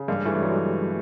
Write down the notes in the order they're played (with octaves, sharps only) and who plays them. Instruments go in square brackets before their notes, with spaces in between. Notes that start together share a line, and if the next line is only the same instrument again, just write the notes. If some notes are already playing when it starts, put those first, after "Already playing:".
Already playing: [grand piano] C#3
[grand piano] G2 [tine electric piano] G#3 A#3
[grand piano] E3 [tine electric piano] G3 A3
[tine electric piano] F#3 G#3 [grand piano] A3